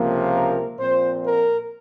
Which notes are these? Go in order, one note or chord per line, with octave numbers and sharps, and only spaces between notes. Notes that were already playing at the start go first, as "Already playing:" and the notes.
Already playing: C#2 C3 F3 A#3
A#4
A#2 F3 C4 C5
A#4